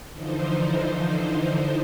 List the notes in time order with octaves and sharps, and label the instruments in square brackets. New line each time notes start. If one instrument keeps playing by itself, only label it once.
[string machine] D3 E3 F3 D#4 C5